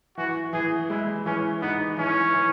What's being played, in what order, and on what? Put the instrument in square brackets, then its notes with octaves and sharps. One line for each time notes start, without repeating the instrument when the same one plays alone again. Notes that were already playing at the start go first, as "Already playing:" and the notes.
[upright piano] E3 [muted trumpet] F#4
[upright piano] E3 [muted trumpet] G#4
[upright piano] G#3 [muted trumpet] E4
[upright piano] E3 [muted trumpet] C#4
[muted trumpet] B3 [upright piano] D#4
[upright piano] E3 [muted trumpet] C#4
[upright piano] E3